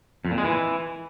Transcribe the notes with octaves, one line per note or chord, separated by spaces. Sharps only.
F2
A#2
G#3
E3